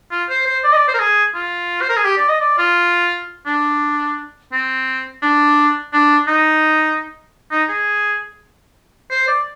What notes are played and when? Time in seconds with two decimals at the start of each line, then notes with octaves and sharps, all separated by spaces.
0.11 F4
0.29 C5
0.47 C5
0.64 D5
0.72 D#5
0.76 D5
0.88 C5
0.94 A#4
1.00 G#4
1.35 F4
1.81 C5
1.89 A#4
1.97 G#4
2.05 G4
2.17 D5
2.29 D#5
2.41 D5
2.58 F4
3.46 D4
4.52 C4
5.22 D4
5.93 D4
6.28 D#4
7.52 D#4
7.69 G#4
9.11 C5
9.28 D5